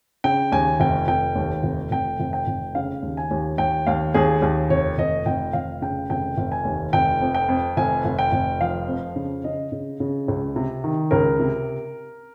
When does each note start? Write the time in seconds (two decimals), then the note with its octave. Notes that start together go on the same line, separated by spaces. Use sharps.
0.24 C#3 G5
0.52 D#2 G#5
0.80 F1 G5
1.07 F1 G5
1.35 D#2
1.63 F1
1.91 F1 G5
2.20 F1
2.33 G5
2.47 F1
2.75 C#3 F5
3.03 D#2
3.17 G#5
3.31 D#2
3.58 D#2 G5
3.87 D#2 F5
4.14 D#2 G#4
4.42 D#2
4.70 F1 C#5
4.98 F1 D#5
5.26 F1 G5
5.53 F1 F5
5.82 C#3 G5
6.10 F1 G5
6.37 F1
6.52 G#5
6.65 D#2
6.93 F1 G5
7.21 F2
7.35 G5
7.48 F2
7.77 F1 G#5
8.05 F1
8.19 G5
8.32 F1
8.61 F3 F5
8.88 F2
9.16 C#3
9.44 C#3 D#5
9.72 C#3
10.00 C#3
10.28 C#2
10.56 C3
10.84 D#3
11.11 C#2 A#4
11.39 C3